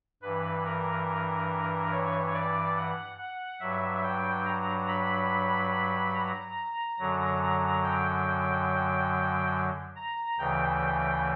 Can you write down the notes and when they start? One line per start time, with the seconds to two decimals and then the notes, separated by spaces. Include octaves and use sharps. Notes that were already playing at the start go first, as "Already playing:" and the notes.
0.22 G2 E3 B4
0.65 A#4
1.92 C#5
2.34 D5
2.76 F#5
3.18 F#5
3.60 G2 F#3 E5
4.03 G5
4.46 A#5
4.88 B5
6.15 A#5
6.99 F#2 D3 F#3
7.84 G5
9.96 A#5
10.38 D2 C#3 E3 G5